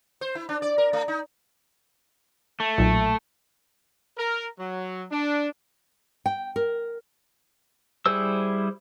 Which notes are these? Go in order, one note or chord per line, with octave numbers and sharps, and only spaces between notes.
C5
E4
D4
D5
A#4
A3
D#4
A3
B1 A#2
A#4
F#3
D4
G5
A#4
G3 E4 G#4 C5 E6